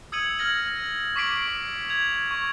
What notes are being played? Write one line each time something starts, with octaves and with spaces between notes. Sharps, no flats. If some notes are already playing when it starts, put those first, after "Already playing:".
D#6 E6 G#6 C#7 D#7 F#7
F6 G#6 A#6 F#7
C#6 D6 B6 C7 D7 F#7
G#6 F7
C#6